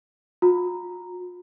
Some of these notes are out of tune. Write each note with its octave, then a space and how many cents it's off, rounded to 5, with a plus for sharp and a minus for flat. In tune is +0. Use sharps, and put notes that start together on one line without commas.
F4 +45 A#5 +0